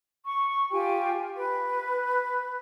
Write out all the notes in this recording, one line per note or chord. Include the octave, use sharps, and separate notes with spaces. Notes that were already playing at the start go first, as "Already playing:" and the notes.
C#6
F4 G4 G5 G#5
B4